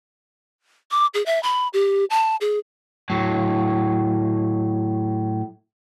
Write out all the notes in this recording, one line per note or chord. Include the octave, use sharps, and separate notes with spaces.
D6
G#4
E5
B5
G4
A5
G#4
A2 F#3